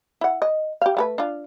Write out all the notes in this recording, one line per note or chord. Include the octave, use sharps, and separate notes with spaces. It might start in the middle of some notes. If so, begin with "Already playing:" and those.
E4 F#5
D#5
G4 F5
A3 A4 B4
D4 F4